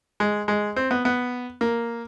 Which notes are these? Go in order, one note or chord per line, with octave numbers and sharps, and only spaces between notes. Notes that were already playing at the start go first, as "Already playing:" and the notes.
G#3
G#3
C4
B3
B3
A#3